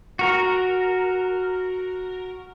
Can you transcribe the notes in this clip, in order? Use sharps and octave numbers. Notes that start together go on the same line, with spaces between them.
F#4 A#4